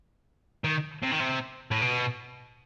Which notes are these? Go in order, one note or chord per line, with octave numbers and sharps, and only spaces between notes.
D#3
C3
D#3
C3
A2
B2